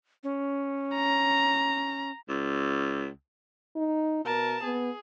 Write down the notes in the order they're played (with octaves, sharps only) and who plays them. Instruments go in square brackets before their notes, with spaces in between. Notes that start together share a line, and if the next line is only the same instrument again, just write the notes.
[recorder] C#4
[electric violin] A#5
[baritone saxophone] C#2
[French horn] D#4
[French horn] B2 [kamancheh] A#4 A5
[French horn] B3 [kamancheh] G#4